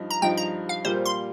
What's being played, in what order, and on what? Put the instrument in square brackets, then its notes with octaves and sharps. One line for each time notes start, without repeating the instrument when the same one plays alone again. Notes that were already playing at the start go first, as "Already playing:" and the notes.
Already playing: [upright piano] G2 F3 D#4
[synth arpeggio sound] A#5
[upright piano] G2 F3 D#4 [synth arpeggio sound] G5
[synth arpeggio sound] A#5
F5
[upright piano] A#2 G3 A#3 F4 [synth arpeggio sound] C5
[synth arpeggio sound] C6